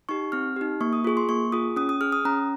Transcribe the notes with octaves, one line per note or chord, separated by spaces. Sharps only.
D#4 G4 C#6
C4 F6
D#4 G4
A#3 C#6
D#6
F4 G#4 C#6
C6
A#3 C#6
F4 G#4 D#6
C#4 D#6
D#6
G#4 F6
D#6
C#4 A#5